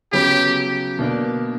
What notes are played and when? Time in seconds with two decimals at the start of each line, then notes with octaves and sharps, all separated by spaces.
0.12 C#3 F#3 B3 G4
0.99 B2 A#3 D4